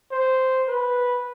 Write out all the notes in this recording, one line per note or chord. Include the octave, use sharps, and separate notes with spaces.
C5
B4